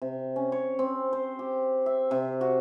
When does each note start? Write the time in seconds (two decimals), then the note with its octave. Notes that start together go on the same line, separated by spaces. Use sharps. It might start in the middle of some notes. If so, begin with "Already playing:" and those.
0.02 C3
0.36 C#4
0.52 C#5
0.79 C4
1.13 C5
1.39 G4
1.86 E5
2.11 C3
2.41 F#4